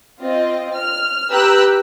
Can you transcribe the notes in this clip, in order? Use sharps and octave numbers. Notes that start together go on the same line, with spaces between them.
C4 F4 D#5
F6
G4 B4 G5 A#5 E6 F#6